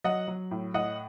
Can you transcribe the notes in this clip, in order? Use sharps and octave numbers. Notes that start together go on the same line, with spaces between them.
F#3 D#5 F#5
F#3
A2
A2 D#5 F#5